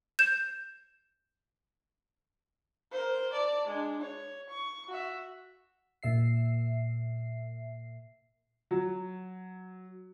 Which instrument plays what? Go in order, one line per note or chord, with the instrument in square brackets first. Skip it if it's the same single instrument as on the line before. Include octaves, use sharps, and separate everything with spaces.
[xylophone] G6 E7
[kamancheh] A#4 C5
D5 A5
G#3 D4
C#5
C#6
F#4 E5
[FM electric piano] A#2 E5 C7
[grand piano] F#3